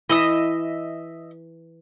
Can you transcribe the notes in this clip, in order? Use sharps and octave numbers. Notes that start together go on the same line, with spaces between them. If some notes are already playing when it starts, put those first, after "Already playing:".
E3 D#5 E5 D#6